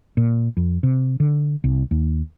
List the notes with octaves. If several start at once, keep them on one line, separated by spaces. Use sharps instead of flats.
A#2
F2
C3
D3
C2
D#2